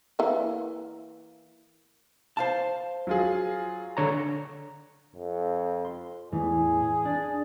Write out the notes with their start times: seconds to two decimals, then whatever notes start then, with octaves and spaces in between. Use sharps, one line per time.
0.19 E3 A#3
2.37 C5 F5 A5
3.07 F#3 F4 G#4
3.97 D3 C#5 A#5
5.16 F2
5.85 C6
6.32 E2 A2 E3 G#4
7.05 D4